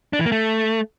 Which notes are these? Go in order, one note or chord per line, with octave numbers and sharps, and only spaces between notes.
D4
E3
A#3
A3